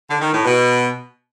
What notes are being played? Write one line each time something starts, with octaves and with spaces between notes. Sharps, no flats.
D3
D#3
A2
B2